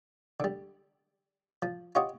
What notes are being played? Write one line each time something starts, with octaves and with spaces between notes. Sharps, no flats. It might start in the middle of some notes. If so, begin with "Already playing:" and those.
D3 G3
F3
F4 G4 C#5 D#5 F#5